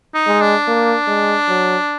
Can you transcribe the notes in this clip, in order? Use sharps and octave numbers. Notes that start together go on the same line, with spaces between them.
D#4
G#3
D4
A#3
G#3
F#3